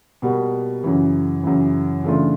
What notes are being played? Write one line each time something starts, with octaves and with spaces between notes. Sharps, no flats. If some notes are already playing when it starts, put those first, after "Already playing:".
B2 G3 A#3
F#2 C#3 E3
F#2 C#3 E3
C#3 E3 A3 D4 F4